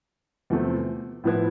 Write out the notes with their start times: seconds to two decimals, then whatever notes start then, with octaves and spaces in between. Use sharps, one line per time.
0.50 E2 C3 F3 A3 C4
1.24 A2 F3 B3 E4 B4